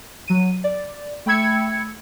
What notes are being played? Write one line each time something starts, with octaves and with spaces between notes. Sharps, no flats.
F#3 D#7
D5
A3 G5 B5 E6 G#6 C#7